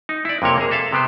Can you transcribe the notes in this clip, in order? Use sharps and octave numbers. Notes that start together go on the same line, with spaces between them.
D#4
E4 D5
F2 C3 A#3 C#5 G5
A#3 G#4
A4 E5 F5
C3 B3 G4 C5